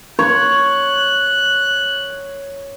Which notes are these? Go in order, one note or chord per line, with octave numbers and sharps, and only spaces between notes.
C#5 F#6